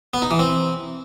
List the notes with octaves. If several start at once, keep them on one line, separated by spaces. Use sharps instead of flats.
B3
D#4
E3
C4